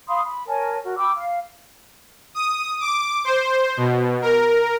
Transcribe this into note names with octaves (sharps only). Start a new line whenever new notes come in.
F5 B5 C6 D#6
B5
A#4 C#5 G#5 A5
F#4 A#4
G5 B5 D6 E6
F5
D#6
D6
C5
B2
A#4